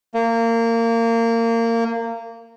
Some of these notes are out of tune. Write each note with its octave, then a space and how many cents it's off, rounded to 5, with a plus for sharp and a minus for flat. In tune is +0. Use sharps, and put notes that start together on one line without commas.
A#3 -25